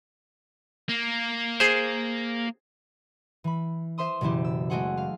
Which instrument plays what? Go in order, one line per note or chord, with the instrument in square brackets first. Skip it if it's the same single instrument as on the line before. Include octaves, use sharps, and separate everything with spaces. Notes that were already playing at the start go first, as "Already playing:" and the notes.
[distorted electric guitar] A#3
[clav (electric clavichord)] G#4 C5
[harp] E3 B5
C5 E5 C6 D#6
F#1 B2 E3 E4 G4
E6
G#3 A3 F#4 G#4 C5 F#5
F5